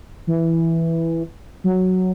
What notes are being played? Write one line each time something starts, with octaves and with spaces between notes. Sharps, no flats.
E3
F#3